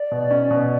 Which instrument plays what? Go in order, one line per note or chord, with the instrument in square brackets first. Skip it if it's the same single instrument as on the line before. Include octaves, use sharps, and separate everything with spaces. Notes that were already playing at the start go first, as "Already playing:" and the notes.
Already playing: [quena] D5
[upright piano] B2
C#4
B2